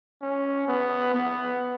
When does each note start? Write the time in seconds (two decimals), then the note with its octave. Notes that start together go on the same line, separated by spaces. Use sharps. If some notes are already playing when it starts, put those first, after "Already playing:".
0.22 C#4
0.68 B3
1.14 B3